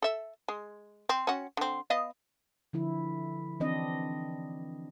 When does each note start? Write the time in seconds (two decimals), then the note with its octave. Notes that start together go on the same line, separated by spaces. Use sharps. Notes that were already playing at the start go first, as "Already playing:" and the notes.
0.02 A4 E5
0.48 G#3
1.09 C4
1.27 C#4 F#4
1.57 D3 C4
1.90 B3 D#5 F5
2.73 D3 F3 E4
3.60 E3 C4 D4 D#5